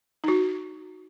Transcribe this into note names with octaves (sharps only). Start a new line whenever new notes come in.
D#4 F#4